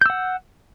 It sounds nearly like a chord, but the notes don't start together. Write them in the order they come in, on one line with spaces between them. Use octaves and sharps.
G6 E6 F#5